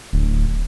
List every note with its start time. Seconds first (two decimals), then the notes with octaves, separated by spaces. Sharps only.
0.13 D1